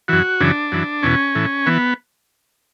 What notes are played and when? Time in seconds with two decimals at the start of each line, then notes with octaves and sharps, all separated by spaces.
0.08 F#2 E3 F#4
0.40 F#2 C#3 E3 D4
0.72 F#2 E3
1.03 E2 B2 C#4
1.35 A2 E3
1.66 E3 B3